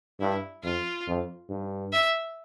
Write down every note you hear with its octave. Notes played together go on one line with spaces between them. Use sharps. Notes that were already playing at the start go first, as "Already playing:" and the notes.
G2 E4
F2 F4
F2
G2
E5